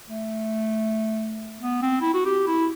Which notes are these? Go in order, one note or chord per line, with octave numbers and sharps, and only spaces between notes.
A3
B3
C4
E4
F#4
G4
E4